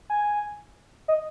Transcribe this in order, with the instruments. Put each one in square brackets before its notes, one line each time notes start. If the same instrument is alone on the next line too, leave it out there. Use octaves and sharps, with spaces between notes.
[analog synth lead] G#5
D#5